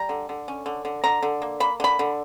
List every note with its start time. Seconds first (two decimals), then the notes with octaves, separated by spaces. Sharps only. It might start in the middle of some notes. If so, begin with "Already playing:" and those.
Already playing: G3 A#5
0.09 D3
0.29 D3
0.48 C#4
0.66 D3
0.85 D3
1.04 D3 A#5
1.23 D3
1.42 A#3
1.60 A#3 B5
1.80 D3 B5
1.99 D3